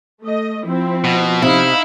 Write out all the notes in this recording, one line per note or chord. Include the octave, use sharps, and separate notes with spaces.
A3 D#5
F3 C4 E4
B2
C3 D#4 E4 G4 F5 B5